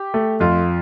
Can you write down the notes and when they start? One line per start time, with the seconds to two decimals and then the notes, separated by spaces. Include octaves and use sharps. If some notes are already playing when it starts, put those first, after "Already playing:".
Already playing: G4
0.14 A3
0.40 F2 F4